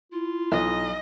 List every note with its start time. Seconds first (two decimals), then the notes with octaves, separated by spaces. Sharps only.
0.12 E4 F4
0.52 B1 D#5